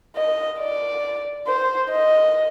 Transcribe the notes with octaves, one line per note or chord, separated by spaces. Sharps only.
D#5
D5
C5
D#5